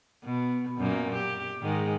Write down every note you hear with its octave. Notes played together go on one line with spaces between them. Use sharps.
B2
F#2 A#2 A#3
G4
G#2 D#3 G#3